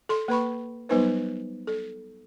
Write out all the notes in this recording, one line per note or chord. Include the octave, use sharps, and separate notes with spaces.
A4 C6
A#3 B4 B5 C#6
F#3 G3 B3 D#4 B4 C5
A4